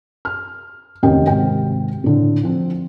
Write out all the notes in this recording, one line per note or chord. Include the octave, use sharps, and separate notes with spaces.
F6
F1 D#2 C#4 A#4 D#5 G5
G#1 C3 G5
A2 D3
F3 C4